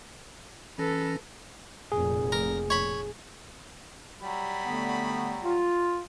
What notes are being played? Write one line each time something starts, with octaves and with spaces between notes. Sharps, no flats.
E3 C#4 A4 B4 A#6
F1 A#2 G#4
A#4
C#5 B5
F#3 G3 B5
D3 A3 B3
F4